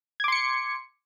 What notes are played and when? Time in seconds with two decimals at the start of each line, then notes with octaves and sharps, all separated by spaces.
0.20 G#6
0.24 D6
0.28 C6
0.32 C#7